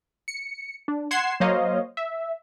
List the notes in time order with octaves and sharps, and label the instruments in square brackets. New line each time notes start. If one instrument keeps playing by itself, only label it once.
[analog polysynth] C#7
D4
F#5 C6 G#6 C7 E7
F#3 A#3 C5 C#5 D#5 F5
E5